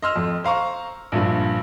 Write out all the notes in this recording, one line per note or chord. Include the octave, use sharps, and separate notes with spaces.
D#5 C6 E6 F6
F2
C5 F5 A#5 C#6
A#1 G2 F3